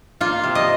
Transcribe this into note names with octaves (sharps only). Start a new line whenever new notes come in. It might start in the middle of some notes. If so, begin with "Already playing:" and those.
A#3 F4
C3
D#5